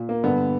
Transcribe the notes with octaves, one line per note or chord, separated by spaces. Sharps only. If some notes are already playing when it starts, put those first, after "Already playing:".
Already playing: A#2
A#3
G2 D3 B3